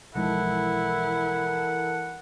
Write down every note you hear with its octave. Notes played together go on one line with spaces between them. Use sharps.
B1 E3 F3 G#3 E4 A4 A#4 F#5